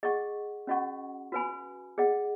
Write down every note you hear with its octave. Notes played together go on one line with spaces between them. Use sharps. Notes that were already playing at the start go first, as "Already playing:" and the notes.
G#4 D#5 F#5 C#6
C#4 F#4 D#5 F#5 C#6
F#4 B4 G#5 B5
G#4 D#5 F#5